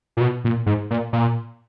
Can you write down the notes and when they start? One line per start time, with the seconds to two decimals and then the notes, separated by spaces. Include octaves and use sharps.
0.17 A#2
0.21 B2
0.44 A#2
0.66 G#2
0.91 A#2
1.13 A#2